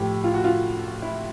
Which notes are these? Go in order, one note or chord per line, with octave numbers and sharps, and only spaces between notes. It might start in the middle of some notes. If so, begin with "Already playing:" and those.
Already playing: A2 F3 G4
F4
F#4
F4
E4